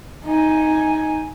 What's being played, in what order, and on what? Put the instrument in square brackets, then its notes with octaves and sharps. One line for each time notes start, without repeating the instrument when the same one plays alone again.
[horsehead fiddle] D#4 G#5